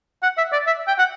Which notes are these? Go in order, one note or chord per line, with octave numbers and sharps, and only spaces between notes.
F#5
E5
D5
E5
G5
F#5